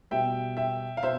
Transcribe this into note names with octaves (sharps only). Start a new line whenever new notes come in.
B2 G3 E5 G5
E5 G5
F5
B2 C5 E5